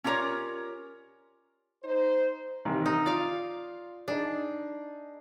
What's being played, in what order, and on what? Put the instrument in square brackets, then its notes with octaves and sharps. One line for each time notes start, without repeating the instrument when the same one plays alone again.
[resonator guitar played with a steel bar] C#4 F4 G4 A#4 C#5 D5
[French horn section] D#4 C5
[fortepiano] A1 C3 D#3
[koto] D#4
[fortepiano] F4 [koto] D5 F5
[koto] D4 [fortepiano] D#4 G#4